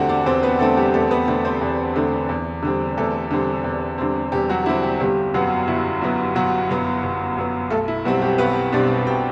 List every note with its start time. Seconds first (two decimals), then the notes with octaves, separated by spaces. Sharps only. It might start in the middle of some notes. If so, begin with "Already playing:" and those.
Already playing: E2 D3 A3 C4 F#4 G4 F#5 G5
0.09 D4 D5
0.26 E2 C4 C5
0.43 B3 B4
0.59 D3 A3 C4 A4
0.77 G3 G4
0.94 E2 A3 A4
1.11 B3 B4
1.28 D3 A3 C4
1.45 C4 C5
1.61 E2
1.96 D3 A3 C4
2.29 E2
2.63 D3 G3 C4
2.98 E2 A3 A4
3.31 D3 G3 C4
3.64 E2
3.98 D3 G3 C4
4.32 E2 G3 G4
4.49 F#3 F#4
4.66 D3 G3 C4 E4
4.83 G3 G4
5.00 G1 G3 G4
5.34 F#2 F#3 B3 F#4
5.68 G1 E4
6.01 F#2 F#3 B3 E4
6.35 G1 F#3 F#4
6.70 F#2 F#3 B3
7.03 G1
7.37 F#2 F#3 B3
7.70 B1 A3 A4
7.88 E4
8.05 B2 F#3 G3 C4 F#4
8.22 G3 G4
8.38 B1 B3 B4
8.72 B2 G3 C4 D4 D5
9.06 B1 G4 G5